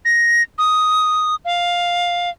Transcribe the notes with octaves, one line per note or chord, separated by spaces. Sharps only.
A#6
D#6
F5